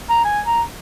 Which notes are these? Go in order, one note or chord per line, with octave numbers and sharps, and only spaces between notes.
A#5
G#5
A#5